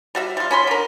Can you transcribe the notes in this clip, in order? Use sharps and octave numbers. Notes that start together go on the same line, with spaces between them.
G3 F#4 E5
G3 F4
C#4 B5 C6
D3 A#4